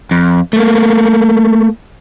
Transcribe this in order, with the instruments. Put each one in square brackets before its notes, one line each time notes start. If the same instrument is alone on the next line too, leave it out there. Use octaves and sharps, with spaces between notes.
[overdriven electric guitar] F2
A3 A#3